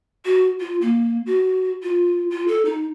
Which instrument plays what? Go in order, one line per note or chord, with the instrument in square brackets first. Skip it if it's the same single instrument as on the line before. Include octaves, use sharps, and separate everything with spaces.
[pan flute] F#4
F4
A#3
F#4
F4
F4
A4
D#4